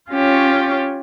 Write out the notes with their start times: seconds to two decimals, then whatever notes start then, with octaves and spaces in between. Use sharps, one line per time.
0.11 C#4 F4 G4 C#5